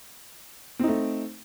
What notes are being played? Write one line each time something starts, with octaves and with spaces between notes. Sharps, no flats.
A3 C4 D#4